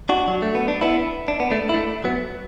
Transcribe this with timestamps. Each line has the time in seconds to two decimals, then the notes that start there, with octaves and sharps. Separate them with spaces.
0.09 D4 F#4
0.28 F#3
0.42 A3
0.55 B3
0.68 D4
0.81 B3 E4
1.28 D4
1.40 B3
1.50 A3 D4
1.69 E4
1.74 A3 D4
2.04 F#3 B3